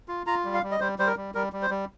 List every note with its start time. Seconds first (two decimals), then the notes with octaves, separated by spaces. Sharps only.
0.08 F4
0.27 F4 A#5
0.45 G3
0.54 F5
0.63 G3
0.71 D#5
0.80 G3 C5
0.99 G3 C5
1.07 A#4
1.17 G3
1.35 G3 A#4
1.53 G3
1.62 C5
1.70 G3